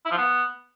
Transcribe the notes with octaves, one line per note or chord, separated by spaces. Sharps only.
E4
F3
B3